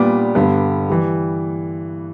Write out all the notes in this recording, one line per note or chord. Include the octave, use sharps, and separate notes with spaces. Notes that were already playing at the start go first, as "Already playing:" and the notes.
Already playing: A#2 G3 B3 D4 D6
G2 D3 G3 B3
E3 G3